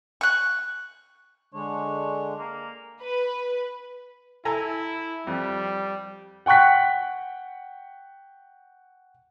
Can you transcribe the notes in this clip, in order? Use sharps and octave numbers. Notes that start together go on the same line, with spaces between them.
C#6 F#6
D3 G#3 D4 C#5
A#3
B4
E4 A4 G#5 A#5
F2 G3
F#5 G5 C#6 F#6 B6